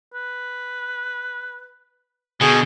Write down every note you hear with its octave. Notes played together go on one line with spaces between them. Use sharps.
B4
B2 D3 D#4 G#4